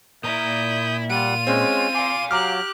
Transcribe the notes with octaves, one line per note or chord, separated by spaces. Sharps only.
A#2 E4 A#5 D#6 G6
G3 F4 F#5 D#7
G#3 C4 C#4
F5 G#5 C6 D6
F#3 G4 A#5 D6 F6 F#6